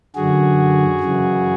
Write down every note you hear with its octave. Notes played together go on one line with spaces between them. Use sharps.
F#2 D3 F#4 G#4
F#2 C#3 E3